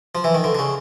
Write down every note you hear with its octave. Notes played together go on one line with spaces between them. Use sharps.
F3
E3
D#3
D3
D3
C#3